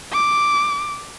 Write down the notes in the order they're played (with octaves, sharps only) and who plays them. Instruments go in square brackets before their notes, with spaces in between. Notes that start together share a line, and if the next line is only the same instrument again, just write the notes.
[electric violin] D6